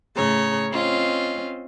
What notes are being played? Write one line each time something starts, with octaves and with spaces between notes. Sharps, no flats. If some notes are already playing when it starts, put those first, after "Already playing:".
A2 C#3 C#5 A#5
C4 C#4 F4 D#5